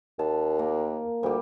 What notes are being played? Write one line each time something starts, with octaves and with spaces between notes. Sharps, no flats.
D#2 A5
A#3
D2 G3 G4